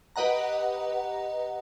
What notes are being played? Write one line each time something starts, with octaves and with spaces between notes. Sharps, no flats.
G4 B4 D#5 F#5 A#5